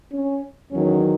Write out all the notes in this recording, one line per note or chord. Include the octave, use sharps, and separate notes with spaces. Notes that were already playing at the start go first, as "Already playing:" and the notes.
C#4
E2 D#3 F#3 C#4